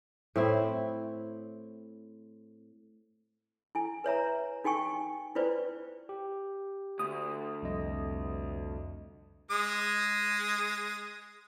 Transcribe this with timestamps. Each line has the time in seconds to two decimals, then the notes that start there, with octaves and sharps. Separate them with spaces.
0.36 A2 C4 E4
3.75 E4 G#5
4.04 B4 C#5 E5 A#5
4.64 D#4 F#4 G5 G#5 C#6
5.35 E4 F4 B4 C5 D5
6.09 G4
6.99 D2 D#6
7.63 C2 F2 D#5
9.51 G#3 D#6